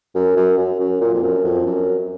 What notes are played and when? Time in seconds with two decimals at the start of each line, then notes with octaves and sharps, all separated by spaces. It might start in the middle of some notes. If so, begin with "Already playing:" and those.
0.15 F#2
0.37 F#2
0.58 F#2
0.80 F#2
1.01 A#2
1.13 F2
1.23 F#2
1.44 F2
1.66 F#2